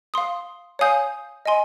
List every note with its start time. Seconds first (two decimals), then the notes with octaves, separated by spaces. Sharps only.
0.14 F5 C6 D#6
0.79 C#5 F5 G#5 D#6 G6
1.46 D#5 G#5 C6